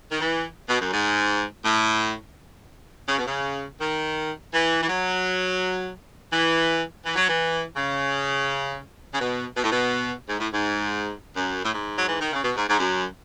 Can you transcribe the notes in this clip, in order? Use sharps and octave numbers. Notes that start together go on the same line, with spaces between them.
D#3
E3
B2
F#2
G#2
A2
C#3
B2
C#3
D#3
E3
E3
F#3
E3
E3
F#3
E3
C#3
C#3
B2
B2
A2
B2
G#2
A2
G#2
F#2
A2
G#2
F#3
E3
D#3
C#3
B2
G#2
G#2
F#2